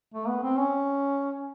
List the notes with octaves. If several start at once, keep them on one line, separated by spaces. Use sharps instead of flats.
A3
B3
C4
C#4